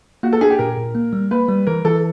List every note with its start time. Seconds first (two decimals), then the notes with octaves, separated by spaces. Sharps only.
0.23 A#3 F#4
0.33 A4
0.41 D4 G#4
0.50 G4
0.59 A#2 A#4
0.78 A#2
0.95 A#3
1.13 G3
1.31 A#3 B4
1.48 G3
1.67 E3 A#4
1.85 E3 A4